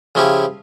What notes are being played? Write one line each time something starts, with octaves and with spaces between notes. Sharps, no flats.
C#3 F3 C#4 E4 G4